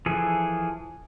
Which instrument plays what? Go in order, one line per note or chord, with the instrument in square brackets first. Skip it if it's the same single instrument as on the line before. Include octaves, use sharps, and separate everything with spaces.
[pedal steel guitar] E3 F3 G#4 A4